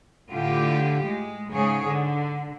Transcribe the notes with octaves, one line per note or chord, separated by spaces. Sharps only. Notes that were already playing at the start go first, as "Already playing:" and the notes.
A2 D3 F4 G4
G#3
G#2 C#3 G#4 C#5
D3